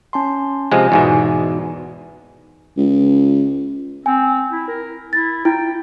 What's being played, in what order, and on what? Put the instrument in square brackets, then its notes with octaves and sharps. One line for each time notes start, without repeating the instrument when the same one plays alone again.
[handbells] C#4 A5 C6
[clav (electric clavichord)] C3 F3 G#3 [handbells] G#5
[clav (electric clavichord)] E2 G#2 B2
[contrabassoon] C#2
[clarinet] C4 [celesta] G#5
[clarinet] E4
A#4
[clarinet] E4 [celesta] A6
[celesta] E4 [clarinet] G5